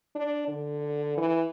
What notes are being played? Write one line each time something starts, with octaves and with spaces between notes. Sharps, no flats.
D4
D3
E3